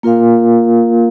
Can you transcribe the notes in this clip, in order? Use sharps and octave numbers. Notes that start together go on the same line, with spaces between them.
A#3 F4 A#4 F5